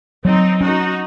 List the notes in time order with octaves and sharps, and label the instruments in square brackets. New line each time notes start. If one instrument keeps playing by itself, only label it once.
[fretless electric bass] F#3 [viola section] C4 D#4
[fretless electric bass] C#4 [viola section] D#4 F#4